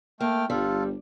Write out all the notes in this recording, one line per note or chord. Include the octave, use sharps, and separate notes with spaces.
A3 A#3 G5 F6
G1 G3 F4 A4